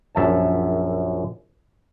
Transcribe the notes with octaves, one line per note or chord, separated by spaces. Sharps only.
A#1 F#2 E5 A5